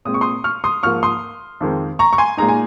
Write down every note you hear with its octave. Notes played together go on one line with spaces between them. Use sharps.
A#2 G#3 C4 D#6
C#6
C6 D#6
C#6 F6
C6 D#6
G#2 F3 A#3 C#6 F6
C6 D#6
F2 D#3 G#3 C4
A#5 C#6
C#6
G#5 C6
A#2 G#3 D#4 A#5
G#5